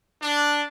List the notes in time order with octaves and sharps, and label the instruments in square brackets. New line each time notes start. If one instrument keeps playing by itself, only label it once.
[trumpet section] D4